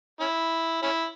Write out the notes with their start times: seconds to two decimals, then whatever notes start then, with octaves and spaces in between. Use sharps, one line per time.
0.20 C#4 E4
0.83 C#4 E4